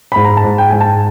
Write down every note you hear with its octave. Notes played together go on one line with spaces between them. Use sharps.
G#2 B5
A#5
A5
G#2
G5
G#2 G#5
A5